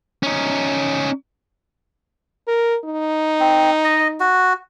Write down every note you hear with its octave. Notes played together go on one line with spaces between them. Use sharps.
C#4 D#4
A#4
D#4
C4
D#5
F#4